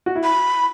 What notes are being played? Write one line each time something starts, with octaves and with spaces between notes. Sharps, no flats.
F#4
E4
B5